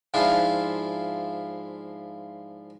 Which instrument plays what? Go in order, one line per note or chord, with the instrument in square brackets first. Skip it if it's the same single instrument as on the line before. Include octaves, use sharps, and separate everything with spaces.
[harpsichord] G#2 F3 D4 E4 F4